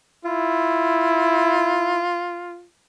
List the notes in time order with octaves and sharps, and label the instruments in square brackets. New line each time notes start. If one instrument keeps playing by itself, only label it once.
[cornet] E4 [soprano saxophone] F4